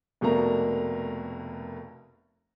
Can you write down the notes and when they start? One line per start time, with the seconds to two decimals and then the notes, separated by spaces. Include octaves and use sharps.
0.21 F1 B2 A3 A#3 A#5